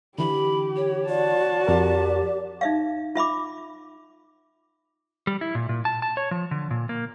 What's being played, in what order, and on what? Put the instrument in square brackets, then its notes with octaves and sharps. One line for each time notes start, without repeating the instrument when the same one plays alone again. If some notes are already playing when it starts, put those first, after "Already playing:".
[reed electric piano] D3 E3 [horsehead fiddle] G4 [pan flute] B5
[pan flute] C#5
[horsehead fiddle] F#4 A5 [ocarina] D5
[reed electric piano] F2 A#4 [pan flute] G4
[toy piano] D#4 E5 F5
F4 E5 B5 D6
[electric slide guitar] G3
E4
A#2
A#2
A5
A5
C#5
F3
D3
A#2
A#3